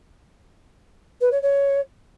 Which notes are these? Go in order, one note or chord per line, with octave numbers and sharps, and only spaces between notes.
B4
C#5
C#5